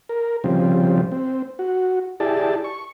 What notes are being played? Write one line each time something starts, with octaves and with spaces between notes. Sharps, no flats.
A#4
C#3 F3 G3 C4
C4
F#4
E4 G4 G#4 D5 A5
C#6